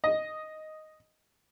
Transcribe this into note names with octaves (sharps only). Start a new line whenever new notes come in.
D#5